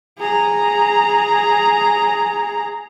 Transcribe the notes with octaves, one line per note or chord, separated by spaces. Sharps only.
G#4 A#5